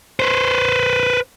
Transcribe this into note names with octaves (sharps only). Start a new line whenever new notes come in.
B4 C5